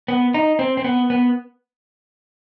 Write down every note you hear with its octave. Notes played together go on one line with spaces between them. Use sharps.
B3
D#4
C4
C4
B3
B3